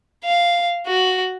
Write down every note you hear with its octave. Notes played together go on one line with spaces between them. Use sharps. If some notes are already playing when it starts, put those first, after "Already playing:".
F5
F#4